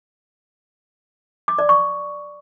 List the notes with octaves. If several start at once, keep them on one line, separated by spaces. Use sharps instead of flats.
D6
D5
C#6